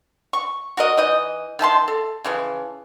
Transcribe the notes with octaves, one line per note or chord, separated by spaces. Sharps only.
C#6
F#4 A#4 D#5
E3 D#4 D#5
D#3 E5 A5 C6
A4
C#3 E3 F3